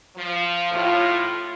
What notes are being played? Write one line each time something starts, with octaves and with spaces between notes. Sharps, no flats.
F3
A2 F4